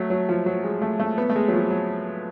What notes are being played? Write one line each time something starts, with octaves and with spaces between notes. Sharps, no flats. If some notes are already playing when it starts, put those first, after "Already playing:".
Already playing: F#3 A3
F#3
F3
F#3
G#3
A3
A3
B3
A3
G#3
F#3
F3
F#3